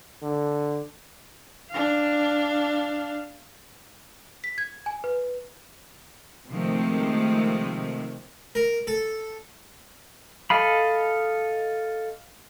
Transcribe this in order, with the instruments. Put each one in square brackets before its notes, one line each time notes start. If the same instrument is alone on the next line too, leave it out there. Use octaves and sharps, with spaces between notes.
[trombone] D3
[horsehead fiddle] D4 F5
[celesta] B6
G#6
G#5
B4
[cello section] C3 D#3 F3 G#3 A3 C4
[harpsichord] A#4
A4
[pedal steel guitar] A4 D#5 F5 B5